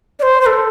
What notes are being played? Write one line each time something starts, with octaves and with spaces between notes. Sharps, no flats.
D5
C5
C5
A4